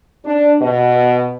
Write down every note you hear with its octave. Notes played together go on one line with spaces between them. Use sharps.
D4
B2